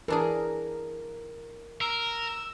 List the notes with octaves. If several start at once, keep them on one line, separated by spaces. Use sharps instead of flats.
E3 D4 G#4 A#4
A#4 E6